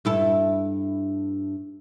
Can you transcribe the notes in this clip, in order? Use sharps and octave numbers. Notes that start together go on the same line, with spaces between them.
G2 E4 A4